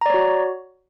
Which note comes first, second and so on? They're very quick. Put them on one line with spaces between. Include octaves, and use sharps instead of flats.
A#5 D5 C#5 F#4